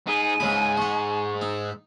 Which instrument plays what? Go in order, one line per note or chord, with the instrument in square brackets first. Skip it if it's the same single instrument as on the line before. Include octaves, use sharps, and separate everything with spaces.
[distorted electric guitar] D#4 G#4 [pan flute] G#5 [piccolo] D#7
[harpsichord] C#2 C#3 B5 [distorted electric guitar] G#2 G#3
[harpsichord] D#5 F#5 [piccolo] C#6
[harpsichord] D#4 [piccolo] E6